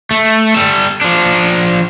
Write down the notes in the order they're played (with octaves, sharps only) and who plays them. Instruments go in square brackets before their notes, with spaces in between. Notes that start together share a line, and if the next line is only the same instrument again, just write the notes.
[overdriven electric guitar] A3
G3 A4
F3 D4